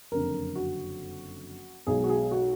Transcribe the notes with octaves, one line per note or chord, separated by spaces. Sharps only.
F#1 F2 D3 A#4
F#4
B1 B2 G#3 G#4
F#4
G#4
F#4